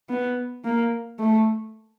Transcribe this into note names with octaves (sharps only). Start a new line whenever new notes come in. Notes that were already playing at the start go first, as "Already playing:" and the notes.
B3
A#3
A3